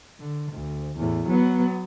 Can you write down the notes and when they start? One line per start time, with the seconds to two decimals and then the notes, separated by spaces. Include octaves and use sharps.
0.20 D3
0.53 D2
0.98 E2 A2
1.29 F#3 B3